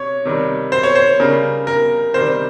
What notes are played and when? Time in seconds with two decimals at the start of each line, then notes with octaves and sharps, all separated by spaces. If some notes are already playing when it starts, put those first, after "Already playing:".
Already playing: C3 C#5
0.25 C3 D#3 G3
0.72 C5
0.83 C#5
0.95 C5
1.20 C#3 G3 A#4
1.67 A#4
2.14 C3 D#3 G3 C5